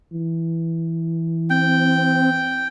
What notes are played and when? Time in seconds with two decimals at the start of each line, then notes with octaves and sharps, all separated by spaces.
0.13 E3
1.50 C4 G5